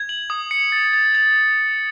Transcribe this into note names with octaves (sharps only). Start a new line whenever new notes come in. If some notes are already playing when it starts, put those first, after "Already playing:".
Already playing: G#6
F#7
D#6
C#7
A6
A6
A6